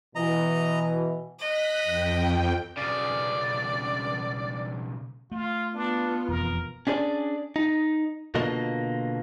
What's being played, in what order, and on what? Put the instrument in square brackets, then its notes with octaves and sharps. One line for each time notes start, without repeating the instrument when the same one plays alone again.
[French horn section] B2 E3 [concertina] D#5 A#5
[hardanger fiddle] D#5 [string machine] F#6 B6
[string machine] F2 G5
[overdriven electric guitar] B1 C#3 [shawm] D5
[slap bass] A3 [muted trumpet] F4
[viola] B3 F4 [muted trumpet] D4
[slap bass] E1 F2 [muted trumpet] A#4
[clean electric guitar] C#4 D4 G#4 B4 D5
D#4
B2 D3 A#3 F4 D#5